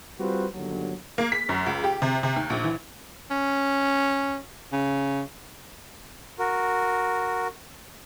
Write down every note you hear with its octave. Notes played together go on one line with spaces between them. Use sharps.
G3 C4 F4 F#4 B4 C5
G1 D#2 D3 F#3
A#3
B6
F#2
C#2
G4
C3
C3
D#2
A#1
E3
C#4
C#3
F#4 A#4